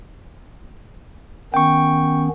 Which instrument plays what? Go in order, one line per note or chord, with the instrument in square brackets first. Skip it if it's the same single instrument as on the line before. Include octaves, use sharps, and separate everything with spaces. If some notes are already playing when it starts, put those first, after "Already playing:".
[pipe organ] D#3 B3 C#4 [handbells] G5 C#6